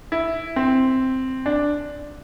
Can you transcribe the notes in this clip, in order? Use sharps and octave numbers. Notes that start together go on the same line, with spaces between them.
E4
C4
D4